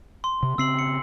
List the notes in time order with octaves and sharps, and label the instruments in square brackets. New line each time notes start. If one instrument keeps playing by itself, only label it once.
[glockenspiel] C6
[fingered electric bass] C3
[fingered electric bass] C#3 C4 [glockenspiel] E6 C7 F#7
[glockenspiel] C#7